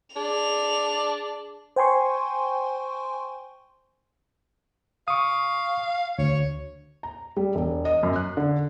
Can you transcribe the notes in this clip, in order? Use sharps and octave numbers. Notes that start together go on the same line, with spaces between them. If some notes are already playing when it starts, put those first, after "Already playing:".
D4 G#4 F7
C5 G5 G#5 C6 C#6
F5 C#6 D#6
D2 C#5
A#5
G3
E1
D#5
F#2
F#6
D3